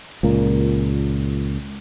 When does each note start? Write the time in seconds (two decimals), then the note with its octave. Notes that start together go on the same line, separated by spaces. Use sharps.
0.23 C#2 A#2 A#3